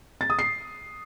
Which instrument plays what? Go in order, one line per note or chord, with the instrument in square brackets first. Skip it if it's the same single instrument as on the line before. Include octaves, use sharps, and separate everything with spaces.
[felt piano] A6
D#6
C7